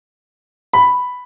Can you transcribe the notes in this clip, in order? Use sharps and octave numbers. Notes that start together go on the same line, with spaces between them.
B5